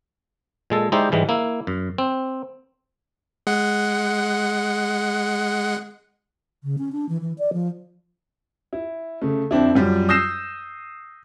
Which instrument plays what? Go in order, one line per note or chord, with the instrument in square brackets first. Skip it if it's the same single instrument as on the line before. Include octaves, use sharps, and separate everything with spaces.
[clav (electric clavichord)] A#2 G#3 A4
G#3 D#4 E4 G4 C5 D5
G#2 E3 G3 G#3
A#3 E4
F#2
C4
[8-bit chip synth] G#3 F#5
[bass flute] C#3
C#4
D4
E3
E3
D5
F3
[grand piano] E4
C#3 A3
F2 C4 D4 E4
F#2 G3 F4
D#6 E6 G6 A#6 C7 E7